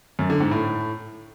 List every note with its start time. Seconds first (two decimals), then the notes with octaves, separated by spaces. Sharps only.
0.19 F#2
0.30 D3
0.40 G#2
0.51 A2